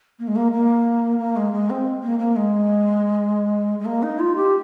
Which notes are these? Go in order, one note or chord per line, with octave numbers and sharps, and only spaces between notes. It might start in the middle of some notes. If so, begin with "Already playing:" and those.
A#3
G#3
A#3
A#3
A#3
G#3
G#3
C4
A#3
A#3
G#3
G#3
A#3
D#4
F4
G4